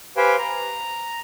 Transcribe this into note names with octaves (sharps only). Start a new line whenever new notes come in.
G4 B4 C5 F5 G5 G#5
A#5